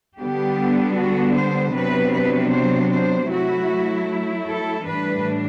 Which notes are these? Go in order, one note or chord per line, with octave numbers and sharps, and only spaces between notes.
D3 G3 B3 D4 G4
F#4
C5
C3 F#3 B3 D4 B4
B4
C5
C5
F#3 A3 E4 F#4
A4
A2 E3 G3 D4 B4